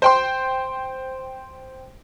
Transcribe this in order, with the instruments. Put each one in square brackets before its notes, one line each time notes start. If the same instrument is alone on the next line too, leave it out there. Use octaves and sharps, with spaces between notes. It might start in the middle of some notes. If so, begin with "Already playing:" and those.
[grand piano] C5 G5 C6